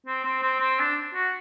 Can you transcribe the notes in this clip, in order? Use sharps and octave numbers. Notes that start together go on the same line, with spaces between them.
C4
C4
C4
C4
D4
F#4